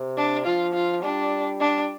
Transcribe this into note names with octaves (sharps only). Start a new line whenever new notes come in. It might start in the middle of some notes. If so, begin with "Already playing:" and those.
Already playing: C3
D4
F3 F4
F4
G3 D4
D4